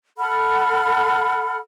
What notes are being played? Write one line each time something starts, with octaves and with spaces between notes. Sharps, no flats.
A4 F#5 B5 F6